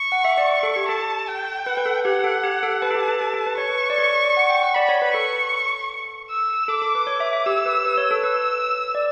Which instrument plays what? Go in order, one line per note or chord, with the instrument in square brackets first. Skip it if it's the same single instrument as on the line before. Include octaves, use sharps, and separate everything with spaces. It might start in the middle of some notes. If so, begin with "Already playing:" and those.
Already playing: [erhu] C#6
[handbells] F#5
E5
D5
A4
G4
[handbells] A4 [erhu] A5
[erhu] G5
[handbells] B4
B4
A4
[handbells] G4 [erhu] F#5
[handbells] G4
A4
G4
A4
[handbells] B4 [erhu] A5
[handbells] A4
G4
A4
A4
A4
B4
[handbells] C#5 [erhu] C#6
[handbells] B4
D5
C#5
D5
D5
F#5
G5
F#5
[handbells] D5 [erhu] B5
[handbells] C#5
B4
[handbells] A4 [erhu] C#6
[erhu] E6
[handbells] A4 [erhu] D6
[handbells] A4
B4
C#5
E5
E5
[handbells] G4 [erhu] E6
[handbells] B4
B4
C#5
A4
[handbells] B4 [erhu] E6
[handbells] D5